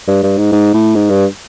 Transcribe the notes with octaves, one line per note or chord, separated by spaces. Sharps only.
G2
G2
G#2
G#2
A2
G#2
G2